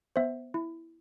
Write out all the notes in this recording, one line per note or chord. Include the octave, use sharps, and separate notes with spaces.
B3 C5 E5
E4